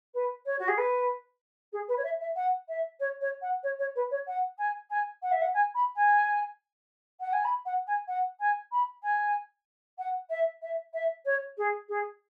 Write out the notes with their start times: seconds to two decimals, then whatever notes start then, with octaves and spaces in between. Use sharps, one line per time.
0.14 B4
0.45 C#5
0.59 F#4
0.68 G#4
0.77 B4
1.72 G#4
1.88 B4
1.97 C#5
2.04 E5
2.20 E5
2.36 F#5
2.68 E5
2.99 C#5
3.21 C#5
3.41 F#5
3.63 C#5
3.78 C#5
3.95 B4
4.10 C#5
4.27 F#5
4.58 G#5
4.90 G#5
5.22 F#5
5.31 E5
5.41 F#5
5.53 G#5
5.74 B5
5.95 G#5
7.20 F#5
7.32 G#5
7.44 B5
7.65 F#5
7.87 G#5
8.07 F#5
8.39 G#5
8.71 B5
9.03 G#5
9.98 F#5
10.29 E5
10.62 E5
10.93 E5
11.25 C#5
11.57 G#4
11.88 G#4